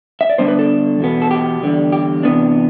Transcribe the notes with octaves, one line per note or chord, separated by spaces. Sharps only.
E5
D5
D3 G3 B3 D4 C5
B4
A4
E2 B2 B3
A4
G4
E2 D3 G3
G4
C3 E3 B3 D4